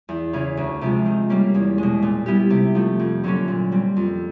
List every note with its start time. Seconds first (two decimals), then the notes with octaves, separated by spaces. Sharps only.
0.09 E2
0.33 C#3 E3
0.57 D2
0.81 C3 F3 G#3
1.06 D#3
1.29 G3 A#3 C#4
1.54 E2
1.78 B2 G#3
2.02 A#2
2.26 G3 B3 E4 G4
2.50 C3
2.75 F3 A3
2.99 F2
3.24 D3 F#3 A#3 C#4
3.48 A#2
3.72 G3 C4
3.97 F2